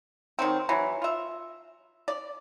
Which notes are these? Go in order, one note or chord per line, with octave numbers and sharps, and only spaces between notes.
D#3 F#3 C4
E3 F#3
F4 E5
D5